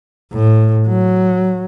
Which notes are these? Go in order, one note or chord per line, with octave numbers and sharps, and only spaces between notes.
A2
F#3